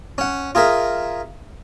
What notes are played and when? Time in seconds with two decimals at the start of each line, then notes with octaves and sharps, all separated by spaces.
0.18 C#4 F#5
0.55 F4 G#4 A#4 E5